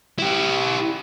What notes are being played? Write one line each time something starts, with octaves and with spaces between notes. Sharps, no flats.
E4 G4